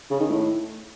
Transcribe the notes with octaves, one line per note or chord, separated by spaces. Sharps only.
C#3
D#3
A2